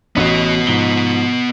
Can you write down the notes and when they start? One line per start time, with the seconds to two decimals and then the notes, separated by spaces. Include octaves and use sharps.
0.16 A1 B3 F#4 D#5
0.67 G#2 F3 G7